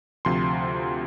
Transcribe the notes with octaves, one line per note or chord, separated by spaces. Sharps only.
D2 C3 F3 C6